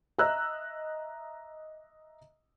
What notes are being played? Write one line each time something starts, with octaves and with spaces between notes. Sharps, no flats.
D#5 E5 A#5 E6 F#6